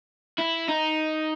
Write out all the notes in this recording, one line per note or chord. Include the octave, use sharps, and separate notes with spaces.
E4
D#4